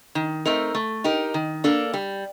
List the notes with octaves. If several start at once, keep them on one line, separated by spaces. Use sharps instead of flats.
D#3
A3 C4 D#4 A#4
A3
D#4 G4 A#4
D#3
A#3 D4 A4
G3